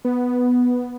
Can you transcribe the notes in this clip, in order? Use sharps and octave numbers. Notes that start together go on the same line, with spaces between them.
B3